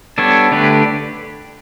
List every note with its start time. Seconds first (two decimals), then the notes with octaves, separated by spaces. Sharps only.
0.18 G3 B3 D4 A4 C#5
0.51 D3 A3 D4 G4 B4